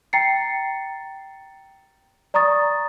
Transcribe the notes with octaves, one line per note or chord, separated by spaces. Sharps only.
G5 A#5 A6 C7 C#7
D5 A#5 C#6 D#6 A6